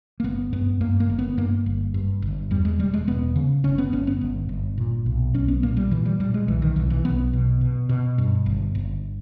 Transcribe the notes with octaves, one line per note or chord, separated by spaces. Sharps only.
A#3
G1 B3
G2 B3
G2 A#3
A#3
G1
B3
G2 A#3
G1
G2
G1
E2 G3
G#3
E1 G3
G#3
E1 B3
C#3
G1 C#4
B3
G1 C#4
B3
G1
G1
A#2
B1
B1 C#4
B3
A#2 A#3
G3
A#2 E3
G3
A#2 G3
G#3
B1 E3
D#3
B1 E3
E3
B1 B3
B2
B2
B2
G2
G1
G1